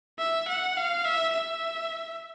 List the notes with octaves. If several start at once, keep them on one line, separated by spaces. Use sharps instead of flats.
E5
F#5
F5
E5
E5